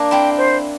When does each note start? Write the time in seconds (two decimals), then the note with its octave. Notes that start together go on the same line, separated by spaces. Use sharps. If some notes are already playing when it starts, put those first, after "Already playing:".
Already playing: A#3 D4
0.11 C4 E4 G5
0.38 C5